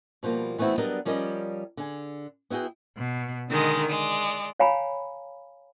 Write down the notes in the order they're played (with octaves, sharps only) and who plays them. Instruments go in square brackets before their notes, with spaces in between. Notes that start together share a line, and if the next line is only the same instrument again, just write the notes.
[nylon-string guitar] B2 F3 G3 A#3
E3 A3 B3 C4 E4 F#4
F#3 G3 B3 D4 A#4 D#5
F3 G3 C#4 A#4 D5 D#5
D3 G#4
B3 E4 F#4 G#4 G5
[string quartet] B2
D3 D#3 G#3
G#3 D5
[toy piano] C#5 F5 G5 G#5 A#5 B5